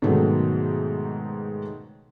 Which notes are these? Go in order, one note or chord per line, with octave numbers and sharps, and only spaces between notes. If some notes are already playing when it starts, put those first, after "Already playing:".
G#2 B2 D#3 F#3 A3